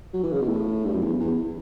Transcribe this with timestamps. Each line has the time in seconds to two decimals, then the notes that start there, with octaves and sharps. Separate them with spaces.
0.13 F#3
0.23 E3
0.32 C#3
0.41 B2
0.49 A2
0.85 G2
0.93 F#2
1.02 E2
1.20 E2